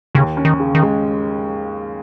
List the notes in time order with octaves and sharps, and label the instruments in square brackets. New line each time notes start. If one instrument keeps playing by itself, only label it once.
[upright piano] D#2 [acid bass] C#3
[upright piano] C#4
[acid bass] D#3
[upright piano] C#3
[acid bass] D#3
[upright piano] G#3